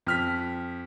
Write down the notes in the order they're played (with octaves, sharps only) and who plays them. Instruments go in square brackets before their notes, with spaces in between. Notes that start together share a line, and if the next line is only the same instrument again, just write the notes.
[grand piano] F2 F6 B6